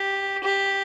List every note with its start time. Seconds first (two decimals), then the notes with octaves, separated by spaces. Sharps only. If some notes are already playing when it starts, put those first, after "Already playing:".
Already playing: G4
0.44 G4